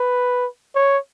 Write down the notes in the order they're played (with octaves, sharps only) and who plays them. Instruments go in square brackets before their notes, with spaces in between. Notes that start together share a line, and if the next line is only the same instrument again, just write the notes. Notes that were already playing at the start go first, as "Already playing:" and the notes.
Already playing: [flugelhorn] B4
C#5